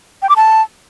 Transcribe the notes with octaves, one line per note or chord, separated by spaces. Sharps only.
G5
D6
A5